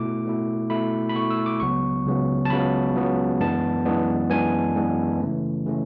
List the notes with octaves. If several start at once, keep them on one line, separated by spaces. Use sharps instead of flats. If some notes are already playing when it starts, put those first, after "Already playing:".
Already playing: B2 A3 E4 D6
B2 A3 E4
B2 A3 E4 B5
B5
B2 A3 E4 C#6
E6
D6
C#2 C#3 F#3 B3 C#6
C#2 C#3 F#3 B3
A5
C#2 C#3 F#3 B3 B5
C#2 C#3 F#3 B3
F#2 E3 G#3 B3 D4 A5
F#2 E3 G#3 B3 D4
F#2 E3 G#3 B3 D4 G#5
F#2 E3 G#3 B3 D4
C#3 E3 A3 C#4
C#3 E3 A3 C#4